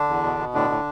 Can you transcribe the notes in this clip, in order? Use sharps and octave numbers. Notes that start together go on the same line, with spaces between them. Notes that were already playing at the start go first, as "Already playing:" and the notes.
Already playing: D3 D4
E2
B2
B2
A2 D3 D4
A2